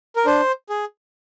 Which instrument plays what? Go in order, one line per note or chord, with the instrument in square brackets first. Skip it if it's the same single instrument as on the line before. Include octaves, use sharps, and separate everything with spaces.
[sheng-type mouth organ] A#4
D4 C5
G#4